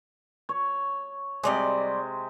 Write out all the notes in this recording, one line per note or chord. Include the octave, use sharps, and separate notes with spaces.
C#5
C3 G3 G#3 D5 D#5